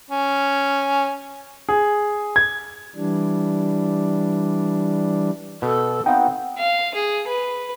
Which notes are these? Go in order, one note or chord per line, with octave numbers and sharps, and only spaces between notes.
C#4
G#4
G#6
E3 G3 D4
B2 A4
B3 C4 D#4 F#4 F5 G5
F5
G#4
B4